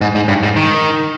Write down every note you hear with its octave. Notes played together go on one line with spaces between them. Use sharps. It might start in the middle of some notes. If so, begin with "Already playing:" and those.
G#2
G#2
G2
G#2
D#3